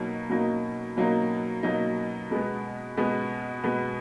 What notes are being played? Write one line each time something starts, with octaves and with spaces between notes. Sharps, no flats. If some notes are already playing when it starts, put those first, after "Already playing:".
Already playing: B2 F#3 A#3 D#4
B2 F#3 A#3 D#4
B2 F#3 A#3 D#4
B2 F#3 A#3 D#4
B2 G#3 B3
B2 G#3 B3
B2 G#3 B3